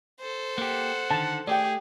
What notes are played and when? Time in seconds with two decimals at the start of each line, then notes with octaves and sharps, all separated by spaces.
0.20 A4 C5
0.58 A#3 G4 F#5
1.11 D3 D#3 A5
1.47 A3 G4 G#4 D5 G5